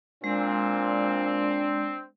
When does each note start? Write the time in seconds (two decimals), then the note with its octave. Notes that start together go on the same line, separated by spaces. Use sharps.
0.24 A#2 G#3 C4 D4